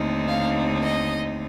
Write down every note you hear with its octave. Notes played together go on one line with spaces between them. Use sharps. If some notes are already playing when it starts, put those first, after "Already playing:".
Already playing: D#2 D3 A3 C4 D#4
F5
D#5